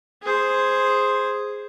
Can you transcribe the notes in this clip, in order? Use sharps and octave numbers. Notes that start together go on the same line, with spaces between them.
G#4 C5